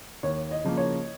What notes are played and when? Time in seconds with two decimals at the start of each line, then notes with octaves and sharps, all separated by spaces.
0.23 D#2 C#5
0.51 D#5
0.64 C#3 F3 A#3
0.77 C#5